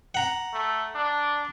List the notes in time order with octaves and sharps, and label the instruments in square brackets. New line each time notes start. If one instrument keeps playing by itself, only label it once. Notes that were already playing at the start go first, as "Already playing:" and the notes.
[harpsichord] F#5 A#5
[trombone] A3
D4